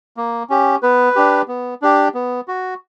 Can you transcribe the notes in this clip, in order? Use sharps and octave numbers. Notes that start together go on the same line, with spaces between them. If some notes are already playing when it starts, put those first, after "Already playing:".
A#3
C#4 G4
B3 B4
D4 G4
B3
D4 G4
B3
F#4